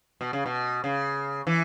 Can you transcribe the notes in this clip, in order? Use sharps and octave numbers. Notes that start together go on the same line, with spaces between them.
B2
C#3
B2
C#3
E3